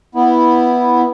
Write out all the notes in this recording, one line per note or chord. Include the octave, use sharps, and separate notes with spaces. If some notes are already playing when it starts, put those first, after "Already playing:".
B3 E4